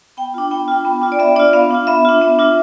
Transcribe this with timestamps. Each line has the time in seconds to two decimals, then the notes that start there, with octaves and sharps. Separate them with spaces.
0.17 B3 G5
0.34 D4 F4
0.51 B3 G5
0.68 D4 F4
0.85 B3
1.02 D4 F4
1.12 D5
1.19 B3 E5
1.36 D4 F4 D5
1.53 B3 F5
1.71 D4 F4
1.87 B3 E5
2.05 D4 F4
2.21 B3
2.39 D4 F4